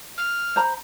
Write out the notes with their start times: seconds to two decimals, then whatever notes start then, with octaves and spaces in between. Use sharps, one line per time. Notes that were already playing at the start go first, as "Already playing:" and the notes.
0.17 F6
0.56 C5 A#5 B5